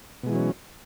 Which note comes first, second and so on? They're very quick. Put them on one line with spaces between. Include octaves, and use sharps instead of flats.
B2 G#3 E3 F#3 C#4